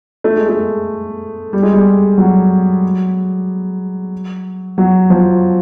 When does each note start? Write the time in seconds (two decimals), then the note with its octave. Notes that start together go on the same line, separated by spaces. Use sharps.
0.24 A3
0.37 G#3
0.49 A3
1.53 G3
1.63 G#3
1.73 G3
2.18 F#3
4.78 F#3
5.10 F3